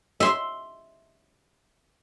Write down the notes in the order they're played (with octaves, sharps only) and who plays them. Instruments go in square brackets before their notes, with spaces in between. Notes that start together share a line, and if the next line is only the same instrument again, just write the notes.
[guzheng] E5 C6